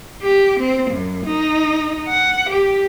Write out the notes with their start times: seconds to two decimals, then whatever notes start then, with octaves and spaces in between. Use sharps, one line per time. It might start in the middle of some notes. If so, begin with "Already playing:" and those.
0.23 G4
0.59 C4
0.91 F#2
1.25 D#4
2.08 F#5
2.49 G4